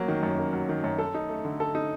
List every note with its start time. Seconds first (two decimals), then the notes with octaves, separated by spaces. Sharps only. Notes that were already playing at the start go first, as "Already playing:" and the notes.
Already playing: F#3 A#3
0.08 D#3
0.23 F#2
0.38 A#3
0.53 F#3
0.69 D#3
0.84 F#2
0.98 A4
1.14 D#4
1.29 A3
1.45 D3
1.60 A4
1.75 D#4